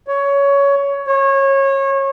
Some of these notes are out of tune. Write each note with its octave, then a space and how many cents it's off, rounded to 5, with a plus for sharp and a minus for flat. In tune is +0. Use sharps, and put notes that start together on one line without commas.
C#5 +15
C#5 -25